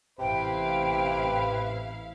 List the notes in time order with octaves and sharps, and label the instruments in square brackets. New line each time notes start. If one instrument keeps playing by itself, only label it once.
[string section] A1 E4 F5 [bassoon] C3 [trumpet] B4 [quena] G5